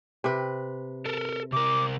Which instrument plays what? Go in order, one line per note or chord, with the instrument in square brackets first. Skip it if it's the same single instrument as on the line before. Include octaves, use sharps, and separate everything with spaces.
[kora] C3 B4
[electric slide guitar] A4 A#4
[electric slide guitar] C3 A#4 [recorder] D6